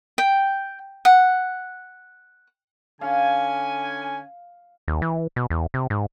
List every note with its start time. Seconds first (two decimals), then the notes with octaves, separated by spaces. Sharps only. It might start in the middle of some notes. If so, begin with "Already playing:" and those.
0.18 G5
1.05 F#5
3.01 D3 C#4 F5 G#5
4.88 D#2
5.02 E3
5.36 B2
5.50 E2
5.74 C3
5.90 G#2